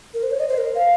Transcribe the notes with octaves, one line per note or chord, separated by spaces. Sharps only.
A#4
C5
C#5
D#5
C5
A#4
F5